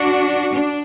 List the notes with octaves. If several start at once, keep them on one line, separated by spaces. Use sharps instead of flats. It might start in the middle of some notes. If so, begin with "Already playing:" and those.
Already playing: D4 F#4
D4